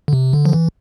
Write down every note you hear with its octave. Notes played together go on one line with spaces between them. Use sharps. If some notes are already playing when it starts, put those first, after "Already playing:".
D3
C3
D3
F3
E3